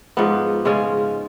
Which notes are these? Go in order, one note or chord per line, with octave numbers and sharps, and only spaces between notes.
G#2 F3 B3
C#3 G#3 C#4 F4